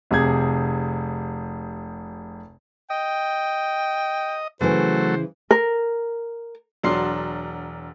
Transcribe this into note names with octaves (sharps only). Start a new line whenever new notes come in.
F1 C3 G#4 G#6
D#5 G5
C#3 E3 F#3 A3 C5
A#4
E1 F#3 D4 C6 C7